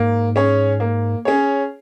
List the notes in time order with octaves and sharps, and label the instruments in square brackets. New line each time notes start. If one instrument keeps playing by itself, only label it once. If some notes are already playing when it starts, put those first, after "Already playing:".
Already playing: [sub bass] G#2 [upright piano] A#3
[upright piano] C#4 G#4 C#5
A#3
C#4 G#4 C#5